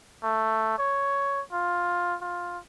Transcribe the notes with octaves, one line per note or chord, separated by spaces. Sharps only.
A3
C#5
F4
F4